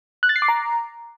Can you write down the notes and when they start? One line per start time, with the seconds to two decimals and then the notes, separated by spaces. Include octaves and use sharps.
0.23 F#6
0.29 A6
0.36 C7
0.42 D6
0.48 A#5